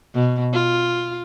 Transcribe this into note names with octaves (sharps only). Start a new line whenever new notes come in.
B2
F4